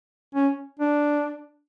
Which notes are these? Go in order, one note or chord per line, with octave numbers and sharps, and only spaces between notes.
C#4
D4